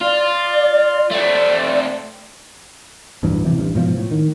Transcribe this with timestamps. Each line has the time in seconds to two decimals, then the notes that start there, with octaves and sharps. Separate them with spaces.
0.01 F4 D5
1.11 A3 C4 D5
3.23 D1 D2 G2 E3
3.45 C3 E3
3.57 A1 G2
3.75 G#2 B2 F3
3.98 A2
4.11 D#3